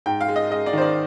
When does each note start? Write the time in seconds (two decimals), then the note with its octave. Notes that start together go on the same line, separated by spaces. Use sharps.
0.06 G#2 G5
0.21 F5
0.28 G#3
0.36 D#5
0.50 G#3 D#5
0.66 D5
0.73 D#3 C5
0.82 D5